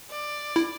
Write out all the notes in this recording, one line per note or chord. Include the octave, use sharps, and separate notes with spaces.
D5
E4